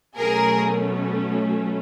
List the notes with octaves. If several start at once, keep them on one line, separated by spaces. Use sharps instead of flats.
B2 F#3 A3 C#4 G#4 A#4